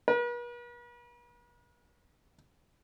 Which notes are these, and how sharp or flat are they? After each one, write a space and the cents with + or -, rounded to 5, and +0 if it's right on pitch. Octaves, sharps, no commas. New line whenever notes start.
B4 -45